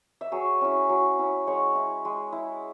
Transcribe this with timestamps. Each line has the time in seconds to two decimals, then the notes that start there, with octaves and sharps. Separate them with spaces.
0.21 E5
0.32 F#3 G#4 C#5
0.61 C#4 E4
0.89 F#3
1.19 C#4 E4
1.47 G#3 C#5 F#5
1.75 E4
2.05 G#3
2.32 E4